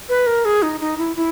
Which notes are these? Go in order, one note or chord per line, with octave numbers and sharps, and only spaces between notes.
B4
A#4
G#4
D#4
D#4
E4
E4